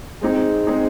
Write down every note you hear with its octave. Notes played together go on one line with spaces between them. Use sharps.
G#3 C4 D#4 G#4
G#3 C4 D#4 G#4